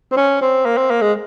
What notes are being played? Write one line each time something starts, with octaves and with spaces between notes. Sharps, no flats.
C4
C#4
C4
A#3
C4
A#3
G#3